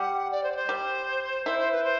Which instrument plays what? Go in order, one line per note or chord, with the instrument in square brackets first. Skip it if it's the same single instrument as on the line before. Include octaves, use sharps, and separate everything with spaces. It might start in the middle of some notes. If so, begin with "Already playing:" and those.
Already playing: [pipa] G3 [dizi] F#5
[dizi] D5
C5
D5
C5
[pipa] G3
[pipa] E4 [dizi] C5
[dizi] C5
B4
C5